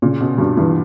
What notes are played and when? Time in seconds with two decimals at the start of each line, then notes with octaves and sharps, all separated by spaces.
0.02 A#2 C#3
0.21 B2 C#4
0.38 G2 F#4
0.57 G2 E3